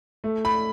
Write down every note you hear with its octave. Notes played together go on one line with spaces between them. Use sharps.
A3
B5